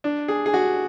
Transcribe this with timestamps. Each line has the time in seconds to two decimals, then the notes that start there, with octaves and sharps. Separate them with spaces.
0.04 D4
0.28 G#4
0.46 G#4
0.54 F#4